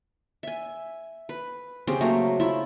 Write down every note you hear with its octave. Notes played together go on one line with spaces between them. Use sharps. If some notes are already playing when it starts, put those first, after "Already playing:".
E5 G#5
B4
C#3 C4 G4 G#4
F#3 A3 A#3 A#5
E4 F4 E5